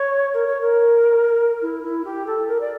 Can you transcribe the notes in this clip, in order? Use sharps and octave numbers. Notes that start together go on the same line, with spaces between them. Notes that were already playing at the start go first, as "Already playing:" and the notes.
Already playing: C#5
A#4
C#5
A#4
E4
E4
G4
A4
A#4
D5